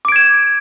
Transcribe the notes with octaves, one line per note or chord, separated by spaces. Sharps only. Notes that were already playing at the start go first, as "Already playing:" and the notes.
D6 G#6 D7 E7